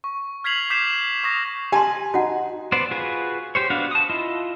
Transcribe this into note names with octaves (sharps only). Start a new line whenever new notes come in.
C#6
F6 G#6 B6 C7 F7 F#7
D6 G6 B6 C7 E7
C#6 D#6 A#6
G4 G#5 A5 C6
D#4 F#4 F#5
B3 C5 D5
F4 F#4 G#4 B4
G4 C5 C#5
B3 D4 F#4 F5
A5 D#6
E4 F4 D#5